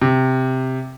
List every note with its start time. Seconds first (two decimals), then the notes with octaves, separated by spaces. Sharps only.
0.02 C3